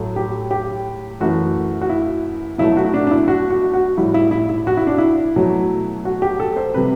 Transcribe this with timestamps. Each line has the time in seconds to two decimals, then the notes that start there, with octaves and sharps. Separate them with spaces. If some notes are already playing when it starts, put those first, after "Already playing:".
Already playing: A2 F#3 A3
0.16 G4
0.51 G4
1.20 F#2 E3 A3 F#4
1.81 F#4
1.89 E4
2.58 B2 F#3 A3 E4
2.77 F#4
2.85 E4
2.94 D4
3.07 D4
3.11 E4
3.28 F#4
3.50 F#4
3.73 F#4
3.97 A2 G3 E4
4.14 E4
4.31 E4
4.49 E4
4.67 F#4
4.77 E4
4.87 D4
4.98 E4
5.36 B2 F#3 A3
6.05 F#4
6.22 G4
6.40 A4
6.56 C5
6.74 C3 G3 B4